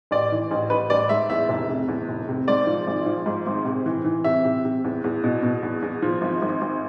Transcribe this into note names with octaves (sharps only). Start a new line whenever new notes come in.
A1 D5
E3
A1
A1 B4
A1 D5
G#2 E5
E2 E5
F1
C3
E2
F1
C3
G#2 D5
F3
G#1
F3
G#2
G#1
C3
E3
E3
C3 E5
C3
C3
E2
E2
B2
B2
E2
E2
F3
G#1
G#1
G#1